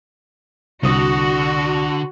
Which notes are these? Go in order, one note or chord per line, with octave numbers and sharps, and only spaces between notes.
C2 D3 F#4 D#6